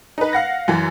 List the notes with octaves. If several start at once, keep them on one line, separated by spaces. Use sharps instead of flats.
D#4 B4
F5 F#5 A#6
F#2 E3